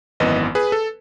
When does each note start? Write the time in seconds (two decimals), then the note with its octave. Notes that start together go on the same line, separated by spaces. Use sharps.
0.20 G#1 F#2 E3 B3 B4 D#5
0.55 G#4 B4
0.72 A4